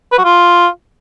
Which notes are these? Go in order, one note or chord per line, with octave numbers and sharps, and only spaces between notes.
B4
F#4
F4